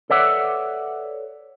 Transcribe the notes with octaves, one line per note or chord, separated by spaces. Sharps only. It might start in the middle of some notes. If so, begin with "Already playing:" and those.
A4 B4 C#5 D5 E5 F#5